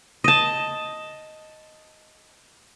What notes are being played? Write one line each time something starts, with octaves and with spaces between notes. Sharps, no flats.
D#5 A5